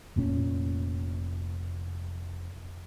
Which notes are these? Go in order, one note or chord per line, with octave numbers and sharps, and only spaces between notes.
F1 A#2 C#4